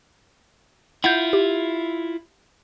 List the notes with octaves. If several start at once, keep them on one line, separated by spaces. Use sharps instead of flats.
E4 F4 F#5 G6
G4